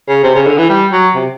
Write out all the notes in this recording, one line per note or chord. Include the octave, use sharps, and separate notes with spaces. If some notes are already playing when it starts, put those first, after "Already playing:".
C#3
C3
C#3
D3
E3
G3
F#3
C3